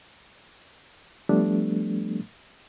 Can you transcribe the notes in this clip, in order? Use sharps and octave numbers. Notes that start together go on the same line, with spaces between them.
F3 G3 A3 B3 D4